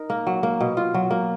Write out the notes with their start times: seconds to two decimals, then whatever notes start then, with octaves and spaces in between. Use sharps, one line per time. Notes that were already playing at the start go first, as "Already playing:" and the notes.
Already playing: D#4 A#4
0.10 A#3
0.27 F#3
0.43 A#3
0.60 B2
0.77 F4
0.94 F#3
1.11 A#3